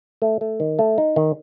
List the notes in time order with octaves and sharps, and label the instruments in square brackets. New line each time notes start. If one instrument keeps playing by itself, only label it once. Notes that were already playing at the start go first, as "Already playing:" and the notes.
[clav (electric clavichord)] A3
A3
D#3
A3
D#4
D#3